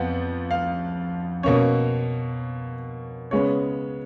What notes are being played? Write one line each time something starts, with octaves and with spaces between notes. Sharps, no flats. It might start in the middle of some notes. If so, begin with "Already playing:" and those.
Already playing: F2 F3 B3 F#5
F5
B2 A#3 C#4 C#5
C#3 G#3 B3 C#5